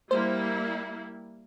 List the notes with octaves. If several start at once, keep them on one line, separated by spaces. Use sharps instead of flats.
G3 A#3 E4 C5